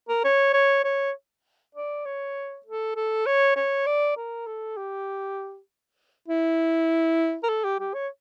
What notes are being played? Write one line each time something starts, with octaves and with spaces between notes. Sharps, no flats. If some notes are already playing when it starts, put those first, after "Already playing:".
A#4
C#5
C#5
C#5
D5
C#5
A4
A4
C#5
C#5
D5
A#4
A4
G4
E4
A#4
A4
G4
G4
C#5